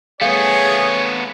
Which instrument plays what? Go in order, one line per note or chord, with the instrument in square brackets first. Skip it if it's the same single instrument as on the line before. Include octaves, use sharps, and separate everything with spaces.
[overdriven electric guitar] A3 B3 [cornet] G#4 [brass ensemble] C#5 [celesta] F5